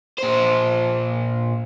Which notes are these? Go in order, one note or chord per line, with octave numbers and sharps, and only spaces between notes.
A#2 C5